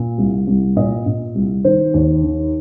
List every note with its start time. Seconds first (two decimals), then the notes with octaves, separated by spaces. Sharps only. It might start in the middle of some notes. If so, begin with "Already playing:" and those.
Already playing: A#2
0.18 C2
0.47 C2
0.76 A#2 D#5
1.06 A#2
1.35 C2
1.65 D#3 C5
1.94 D#2
2.23 D#3